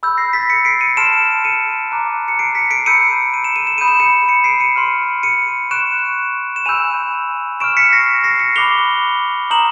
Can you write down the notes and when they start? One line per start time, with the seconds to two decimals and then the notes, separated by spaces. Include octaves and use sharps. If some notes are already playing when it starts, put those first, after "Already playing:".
0.03 B5 E6 G6
0.17 A#6 C7
0.33 A6 B6
0.50 B6 C#7
0.65 C7 D7
0.81 C#7 D#7
0.97 A5 C6 F6 D7 E7
1.44 C#7 D#7
1.92 A#5 D6 F#6
2.28 C#7
2.39 C7 D7
2.55 B6 C#7
2.70 C7 D7
2.86 B5 E6 G6 C#7 D#7
3.34 D#7
3.44 E7
3.56 D#7
3.67 E7
3.78 B5 D#6 G6 D#7
3.88 E7
4.00 C#7 D#7
4.28 C#7 D#7
4.44 C7 D7
4.60 C#7 D#7
4.76 C6 F6
5.23 C#7 D#7
5.71 C#6 F#6 D7 E7
6.56 E7
6.66 G#5 B5 E6 G6 D#7 F7
7.60 C#6 F6 D7 E7
7.77 B6 C#7
7.93 A#6 C7
8.24 A#6 C7
8.39 B6 C#7
8.56 B5 D6 F#6 F7 G7
9.50 A#5 D#6 G6 E7 F#7